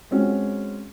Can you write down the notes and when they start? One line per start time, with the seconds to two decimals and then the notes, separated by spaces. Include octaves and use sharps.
0.11 G#3 C4 C#4 F#4